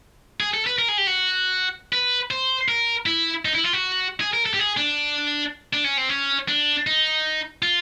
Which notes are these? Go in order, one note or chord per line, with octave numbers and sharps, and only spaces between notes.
G#4
A4
B4
A#4
G#4
G4
F#4
B4
C5
A#4
E4
D#4
E4
F4
F#4
G#4
A#4
A4
G4
G#4
D4
D4
C#4
C4
C#4
D4
D#4
F4